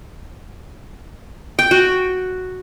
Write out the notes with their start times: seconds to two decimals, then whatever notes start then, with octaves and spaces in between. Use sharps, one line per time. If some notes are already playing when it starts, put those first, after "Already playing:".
1.59 G5
1.71 F#4